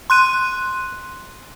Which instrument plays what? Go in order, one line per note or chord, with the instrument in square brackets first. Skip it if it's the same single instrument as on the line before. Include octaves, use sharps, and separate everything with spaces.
[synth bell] C6 F#6 D#7